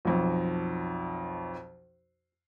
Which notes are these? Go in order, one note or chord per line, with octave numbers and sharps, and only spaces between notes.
B1 F2